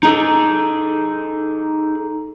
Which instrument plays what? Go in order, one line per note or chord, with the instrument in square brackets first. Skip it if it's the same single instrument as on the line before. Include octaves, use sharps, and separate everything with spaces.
[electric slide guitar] D#4 G#4 A4